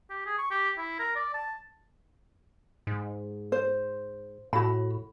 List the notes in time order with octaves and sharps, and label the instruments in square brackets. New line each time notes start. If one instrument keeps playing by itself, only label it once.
[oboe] G4
G#4
C#6
G4
E4
A#4
D5
A5
[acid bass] G#2
[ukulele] C5
[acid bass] A2 [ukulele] F#4 B5